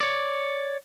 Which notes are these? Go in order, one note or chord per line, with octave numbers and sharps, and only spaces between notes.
C#5 D5